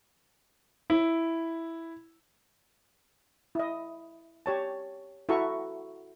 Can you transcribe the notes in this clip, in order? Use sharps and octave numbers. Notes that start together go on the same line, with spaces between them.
E4
E4 D#5
G4 C#5 A5
E4 F#4 A4 E5 A#5 C#6